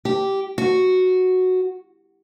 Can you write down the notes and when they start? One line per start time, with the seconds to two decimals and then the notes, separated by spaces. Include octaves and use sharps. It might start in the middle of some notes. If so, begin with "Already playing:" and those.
0.05 G4
0.58 F#4